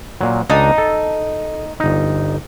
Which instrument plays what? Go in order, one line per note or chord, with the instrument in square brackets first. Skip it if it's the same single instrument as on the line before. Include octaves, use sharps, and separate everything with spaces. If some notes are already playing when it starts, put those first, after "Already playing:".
[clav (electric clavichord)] A#2 F#3
[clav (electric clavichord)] C#2 D4 A5 [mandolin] D#4
[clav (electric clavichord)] A4
G1 D#4